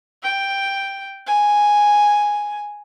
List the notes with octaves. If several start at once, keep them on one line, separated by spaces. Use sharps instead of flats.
G5
G#5